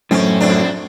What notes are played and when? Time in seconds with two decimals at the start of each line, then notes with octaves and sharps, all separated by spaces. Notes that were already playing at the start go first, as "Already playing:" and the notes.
0.11 F#2 A2 C4 C#4
0.40 F2 C4 D4